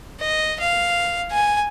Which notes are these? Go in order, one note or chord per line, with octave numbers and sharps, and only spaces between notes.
D#5
F5
G#5